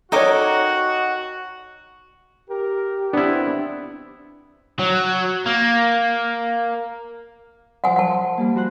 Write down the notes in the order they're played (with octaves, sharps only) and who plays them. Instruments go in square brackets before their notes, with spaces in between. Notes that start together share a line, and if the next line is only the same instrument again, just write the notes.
[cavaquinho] D#4 G5 D6 [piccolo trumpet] F#4 [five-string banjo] A4 A#4 C#5
[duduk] G4 [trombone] A#4
[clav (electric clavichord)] B3 E4 [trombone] C4 [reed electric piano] D4
[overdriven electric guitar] F#3
A#3
[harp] F3 C5 [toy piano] F#5 G#5
[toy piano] F#5 A5
[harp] G3 A#3
F#4 C5 F#6